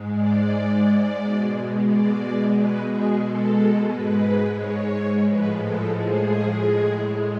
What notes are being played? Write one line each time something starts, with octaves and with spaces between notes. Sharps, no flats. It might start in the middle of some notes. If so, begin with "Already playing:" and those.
Already playing: G#2 G#3
D5
B2 G#3
D5
B2 G#3 B4
G#4
A4
G#2 G#3 B4
C#5
A2 F3 G#3 B4
A4
G#4
A2 G#3